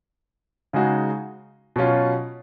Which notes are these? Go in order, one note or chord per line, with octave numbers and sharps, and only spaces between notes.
C#3 G#3 D#4 F#4
B2 F#3 C#4 F4